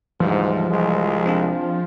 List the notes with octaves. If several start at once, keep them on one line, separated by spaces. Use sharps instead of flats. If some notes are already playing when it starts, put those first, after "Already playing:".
D2 G#2 E3 F3 G3
C2 G#3
C4 D4 F4